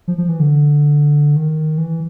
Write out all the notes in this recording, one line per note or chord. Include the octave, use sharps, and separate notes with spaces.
F3
F3
E3
D3
D#3
E3